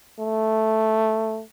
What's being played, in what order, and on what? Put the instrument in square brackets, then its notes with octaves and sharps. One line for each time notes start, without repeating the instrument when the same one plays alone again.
[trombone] A3